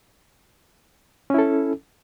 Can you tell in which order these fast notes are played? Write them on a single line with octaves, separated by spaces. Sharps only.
C#4 E4 A4